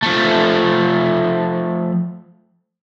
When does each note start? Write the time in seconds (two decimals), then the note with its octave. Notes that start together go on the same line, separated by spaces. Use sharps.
0.03 F3 A3